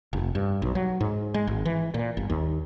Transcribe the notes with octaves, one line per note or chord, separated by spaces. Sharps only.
F1
G2
B1
F#3
G#2
G#3
G#1
E3
A#2
G1
D#2